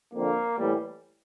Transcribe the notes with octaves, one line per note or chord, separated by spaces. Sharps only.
F2 D3 F3 A#3
A2 E3 G3